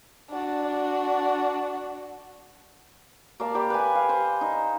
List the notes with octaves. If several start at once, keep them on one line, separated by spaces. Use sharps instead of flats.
D4 F#4
A#3 D5 F5 A5
G4 D5 B5
B4 G#5
F5
C5
D#4